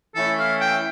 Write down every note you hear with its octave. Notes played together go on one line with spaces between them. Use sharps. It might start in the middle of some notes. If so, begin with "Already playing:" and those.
E3 A3 C#4 E4 A4
F5
G5